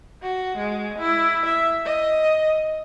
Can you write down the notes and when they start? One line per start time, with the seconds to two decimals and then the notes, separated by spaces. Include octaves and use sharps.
0.22 F#4
0.58 G#3
0.99 E4
1.46 E5
1.85 D#5